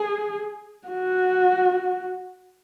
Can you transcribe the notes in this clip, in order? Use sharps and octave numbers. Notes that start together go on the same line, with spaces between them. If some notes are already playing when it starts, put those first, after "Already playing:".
Already playing: G#4
F#4